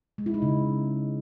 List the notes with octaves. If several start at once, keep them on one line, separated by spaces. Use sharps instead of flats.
G#3
E4
D#4
C#3